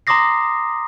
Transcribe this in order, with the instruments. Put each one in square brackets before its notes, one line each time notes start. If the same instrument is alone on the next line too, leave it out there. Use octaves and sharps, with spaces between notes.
[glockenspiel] A#5 C6 D6 D#6 A#6 C7